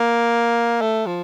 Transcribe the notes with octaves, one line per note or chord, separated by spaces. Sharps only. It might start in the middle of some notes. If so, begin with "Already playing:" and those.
Already playing: A#3
A3
F3